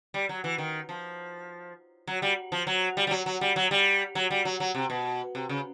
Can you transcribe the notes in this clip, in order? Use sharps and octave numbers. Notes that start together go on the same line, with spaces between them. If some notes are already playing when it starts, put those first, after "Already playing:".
G3
F#3
E3
D#3
F3
F#3
G3
F3
F#3
G3
G3
F#3
F#3
G3
F#3
G3
F#3
G3
F#3
F#3
C3
B2
C3
C#3